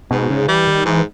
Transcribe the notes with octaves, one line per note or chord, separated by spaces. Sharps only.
G#2 B2
C#3
E3 G3
D#3
G#2 E3